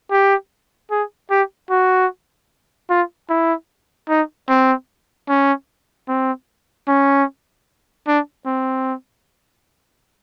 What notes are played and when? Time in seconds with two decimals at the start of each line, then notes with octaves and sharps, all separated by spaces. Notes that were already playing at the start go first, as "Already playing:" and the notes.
0.11 G4
0.91 G#4
1.30 G4
1.70 F#4
2.90 F4
3.29 E4
4.09 D#4
4.49 C4
5.29 C#4
6.08 C4
6.88 C#4
8.07 D4
8.46 C4